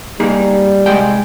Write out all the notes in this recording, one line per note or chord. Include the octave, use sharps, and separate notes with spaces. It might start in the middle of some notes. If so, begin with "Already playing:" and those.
G3 A#3 D#4 G#4
C2 G#3 G5